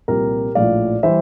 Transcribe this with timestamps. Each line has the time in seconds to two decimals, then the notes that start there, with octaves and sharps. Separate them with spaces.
0.08 C2 A#2 F3 G4 A#4
0.55 A#1 A2 F3 D5 F5
1.03 E3 G3 C5 E5